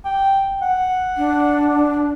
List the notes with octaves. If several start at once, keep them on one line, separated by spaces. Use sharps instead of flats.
G5
F#5
D4